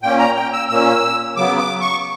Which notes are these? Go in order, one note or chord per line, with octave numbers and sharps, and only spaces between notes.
A#2 A#3 C#4 G5
A#5
G5
E6
A#2 A#3 C#4 E6
C#3 F#3 B3 D6
D6
C#6